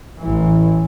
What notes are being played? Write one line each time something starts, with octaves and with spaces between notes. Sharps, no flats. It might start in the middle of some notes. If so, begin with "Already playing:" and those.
A1 E3